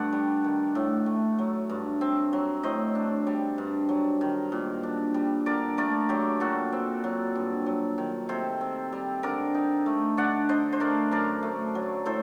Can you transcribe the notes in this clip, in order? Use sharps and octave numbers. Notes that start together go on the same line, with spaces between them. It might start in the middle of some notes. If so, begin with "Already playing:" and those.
Already playing: G2 A3 D5 F#5
G3
D#3
A2
A3
F#3
G2
C4
F#3
A2 C5 D#5
D4
G3
G2
F#3
D#3
A#2
D4
G3
D3 A#4 D5
A3 A#4 D5
F#3 G4
A#2 F#4 A4
C4
F#3
G2
F#3
D#3
C3 A4 C5
C4
G3
D3 A#4 D5
D#4
A3
D3 D5 F#5
D4 C5 D#5
C5
A3 A#4 D5
F#2 A#4 D5
A3
F#3
A2 A4 C5